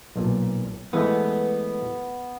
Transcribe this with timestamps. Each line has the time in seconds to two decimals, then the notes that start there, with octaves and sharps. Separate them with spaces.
0.16 B1 A#2
0.93 E3 G#3 A3 B3